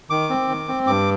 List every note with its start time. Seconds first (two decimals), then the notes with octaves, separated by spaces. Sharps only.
0.10 D#3 D6
0.30 C4
0.48 D#3
0.68 C4
0.87 G2 D6